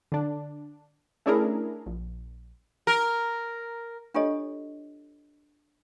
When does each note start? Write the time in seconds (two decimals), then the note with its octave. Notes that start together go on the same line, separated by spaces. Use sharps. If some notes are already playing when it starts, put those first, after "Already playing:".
0.12 D3 D4
1.26 A3 C#4 D4 E4 G#4 A#4
1.86 A#1
2.87 A#4
4.14 D4 F4 G4 A4 C#5 D#5